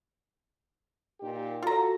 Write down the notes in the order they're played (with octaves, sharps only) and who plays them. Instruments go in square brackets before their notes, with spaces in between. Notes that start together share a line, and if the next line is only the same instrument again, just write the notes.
[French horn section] A#2 D#4 G4
[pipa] F4 A#5 [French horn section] F#4 A4